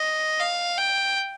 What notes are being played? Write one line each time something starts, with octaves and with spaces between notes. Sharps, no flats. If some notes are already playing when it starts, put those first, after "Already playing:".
Already playing: D#5
F5
G5